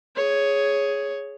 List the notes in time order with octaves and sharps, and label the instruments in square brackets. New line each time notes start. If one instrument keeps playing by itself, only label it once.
[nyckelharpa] G#4 C#5